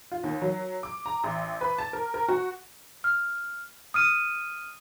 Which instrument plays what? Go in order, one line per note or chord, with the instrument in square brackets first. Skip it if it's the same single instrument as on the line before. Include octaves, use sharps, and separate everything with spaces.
[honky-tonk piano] F4
D#2
F#3
D6
A#5
A1
B4
A5
A#4
A#4
F#4
[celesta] F6
D#6 F6 D#7